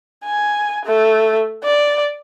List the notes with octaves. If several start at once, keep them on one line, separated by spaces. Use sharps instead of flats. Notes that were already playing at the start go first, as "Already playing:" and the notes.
G#5
A3
D5